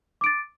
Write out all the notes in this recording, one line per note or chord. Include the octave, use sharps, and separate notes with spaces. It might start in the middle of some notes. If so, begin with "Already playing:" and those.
D6 A6 D7